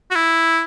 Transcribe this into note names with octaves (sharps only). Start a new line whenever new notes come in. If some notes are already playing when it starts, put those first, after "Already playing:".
F#4
E4